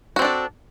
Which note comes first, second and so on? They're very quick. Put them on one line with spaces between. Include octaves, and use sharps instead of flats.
F#4 C4 D4 A4